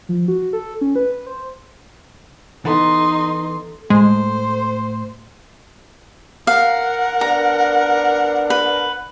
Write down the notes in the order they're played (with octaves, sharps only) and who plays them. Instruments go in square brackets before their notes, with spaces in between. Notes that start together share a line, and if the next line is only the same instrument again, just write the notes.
[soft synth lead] F3
F#4
A4
C#4
B4
B4
C5
[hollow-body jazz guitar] E3 B3 [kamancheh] D#4 C6 [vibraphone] A4
[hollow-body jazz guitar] A2 [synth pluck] G#3 [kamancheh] C5
[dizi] A#4 [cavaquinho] F5 [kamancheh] F#5
[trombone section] B3 D4 [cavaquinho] A#5
[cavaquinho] B4